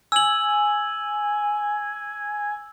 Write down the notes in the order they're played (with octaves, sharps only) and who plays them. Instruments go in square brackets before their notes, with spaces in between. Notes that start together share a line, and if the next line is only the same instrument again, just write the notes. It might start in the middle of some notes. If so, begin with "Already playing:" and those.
[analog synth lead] G#5 [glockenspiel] E6 F#7